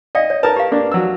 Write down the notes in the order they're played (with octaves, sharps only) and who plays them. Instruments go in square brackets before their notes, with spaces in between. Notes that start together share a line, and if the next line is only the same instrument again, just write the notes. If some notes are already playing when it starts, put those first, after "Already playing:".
[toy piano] D5 F5 G5 [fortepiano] D#5
[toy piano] C#5
[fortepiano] A#4 A5 [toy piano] B4
[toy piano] G4 F5
[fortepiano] A#3 D4
F#3 E6